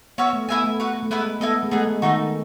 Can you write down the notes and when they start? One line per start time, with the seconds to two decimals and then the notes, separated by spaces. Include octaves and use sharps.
0.18 B3 C#4 F#4 C#5 E5
0.33 A3
0.49 B3 E4 A4 E5 G#5
0.64 A3
0.80 F#4 B4 F#5
1.03 A3
1.10 G#3 B3 E4 B4
1.40 B3 E4 A4 D#5
1.63 G#3
1.71 A3 B3 D#4 G#4
1.87 G#3
2.02 D#3 A3 D#4 F#4